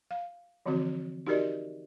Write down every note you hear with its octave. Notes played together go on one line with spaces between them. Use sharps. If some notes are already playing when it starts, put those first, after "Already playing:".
F5
D3 E3 F3 C4 F#4
D#4 F#4 G4 A#4 D5 D#5